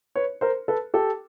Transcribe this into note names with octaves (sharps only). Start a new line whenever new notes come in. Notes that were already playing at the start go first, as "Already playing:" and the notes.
B4 C#5
A#4 C5
A4 B4
G4 A4